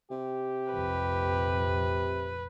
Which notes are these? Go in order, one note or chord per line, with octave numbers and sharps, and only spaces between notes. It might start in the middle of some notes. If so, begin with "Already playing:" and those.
C3 G4
F1 A#1 F2 B4